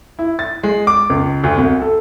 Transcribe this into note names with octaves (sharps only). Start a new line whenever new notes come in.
E4
A6
G#3
D6
C#2
D2
C2
A4